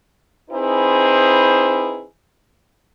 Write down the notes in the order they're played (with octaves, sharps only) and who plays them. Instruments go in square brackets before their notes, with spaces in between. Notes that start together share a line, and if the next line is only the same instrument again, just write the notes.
[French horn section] C4 D#4 E4 G#4 B4 C5